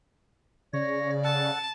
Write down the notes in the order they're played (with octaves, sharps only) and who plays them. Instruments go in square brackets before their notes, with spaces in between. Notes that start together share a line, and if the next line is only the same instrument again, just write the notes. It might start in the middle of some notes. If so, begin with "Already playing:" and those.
[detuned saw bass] C#3 [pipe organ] C#5 A#6 [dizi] D5
[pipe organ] A4 F#5 [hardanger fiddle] A5